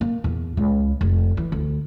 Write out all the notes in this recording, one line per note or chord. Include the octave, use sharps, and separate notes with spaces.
A#3
E2
C#2
F1
E3
D2